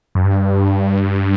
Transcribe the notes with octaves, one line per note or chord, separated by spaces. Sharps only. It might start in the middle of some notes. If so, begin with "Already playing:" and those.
F#2
G2